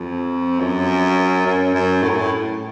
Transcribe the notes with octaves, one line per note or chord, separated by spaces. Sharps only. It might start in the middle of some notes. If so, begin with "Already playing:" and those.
Already playing: F2
F#2
F#2
F#2
A2
F#2
A2